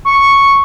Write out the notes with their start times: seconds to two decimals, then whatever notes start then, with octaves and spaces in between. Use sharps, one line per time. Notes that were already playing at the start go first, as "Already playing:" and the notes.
0.05 C#6